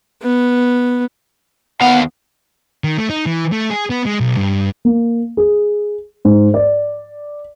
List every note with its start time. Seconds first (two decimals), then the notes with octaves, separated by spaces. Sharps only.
0.22 B3
1.81 D#2 B3 F5 F#5
2.84 D#3
2.98 A3
3.10 D#4
3.26 E3
3.52 A3
3.70 G#4
3.90 B3
4.06 G#3
4.20 B1
4.37 G2
4.85 A#3
5.37 G#4
6.25 G#2
6.54 D5